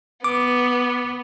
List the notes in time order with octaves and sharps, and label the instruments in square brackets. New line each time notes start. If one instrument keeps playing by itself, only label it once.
[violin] B3 [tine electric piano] D6